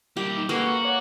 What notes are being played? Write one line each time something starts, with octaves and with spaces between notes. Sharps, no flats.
G3 A#3 G4
D#4
G#3 A#3 C#4 A4 B4 F#5 C#6
F#4
C#5 F#5 D6 F#6